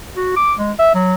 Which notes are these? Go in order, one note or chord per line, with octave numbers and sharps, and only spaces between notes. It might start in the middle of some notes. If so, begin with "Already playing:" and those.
F#4
D6
G#3
E5
F#3